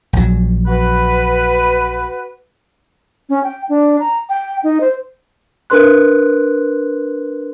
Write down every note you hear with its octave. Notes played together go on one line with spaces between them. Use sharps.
A#1 F#3
F#4 B4
C#4
G5
D4
A#5
G5
D#4
C5
D4 A#4 B4 C6 F#6